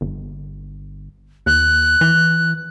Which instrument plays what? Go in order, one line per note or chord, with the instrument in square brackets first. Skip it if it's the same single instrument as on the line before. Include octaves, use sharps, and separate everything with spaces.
[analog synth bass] G1
[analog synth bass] D#2 [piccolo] F#6
[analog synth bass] E3